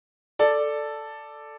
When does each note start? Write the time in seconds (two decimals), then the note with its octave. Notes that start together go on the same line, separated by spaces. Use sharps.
0.39 A4 D5